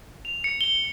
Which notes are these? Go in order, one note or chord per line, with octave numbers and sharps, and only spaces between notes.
F7
C#7
G7